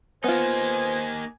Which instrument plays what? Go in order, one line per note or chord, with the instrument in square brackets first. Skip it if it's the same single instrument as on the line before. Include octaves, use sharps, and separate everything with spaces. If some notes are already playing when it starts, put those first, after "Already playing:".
[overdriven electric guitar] A#3 D#4 [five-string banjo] B3 F4 [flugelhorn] C5 [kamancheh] G#5